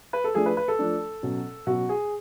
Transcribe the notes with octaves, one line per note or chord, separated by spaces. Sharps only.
B4
A4
F3 A3 D4 G#4
B4
B4
A4
F3 A3 D4
B2 F#3 C#4
B2 F#3 C#4 F#4
G#4